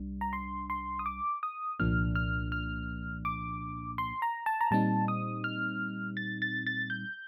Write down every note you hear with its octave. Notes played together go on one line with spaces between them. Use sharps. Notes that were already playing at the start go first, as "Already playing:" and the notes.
Already playing: C2 G3 D4
A#5
C6
C6
D#6
D6
D#6
C2 A#2 F3 A#3 D4 F6
F6
F6
D6
C6
A#5
A5
A#5
A#2 G3 C4 D#4 A5
D#6
F6
A6
A6
A6
G6